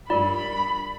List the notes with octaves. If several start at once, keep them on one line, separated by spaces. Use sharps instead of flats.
G2 D4 F4 A#4 D5 B5